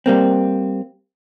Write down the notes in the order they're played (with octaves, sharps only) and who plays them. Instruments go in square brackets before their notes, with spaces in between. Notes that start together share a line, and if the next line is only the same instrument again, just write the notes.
[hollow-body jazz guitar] G3 A#3 C4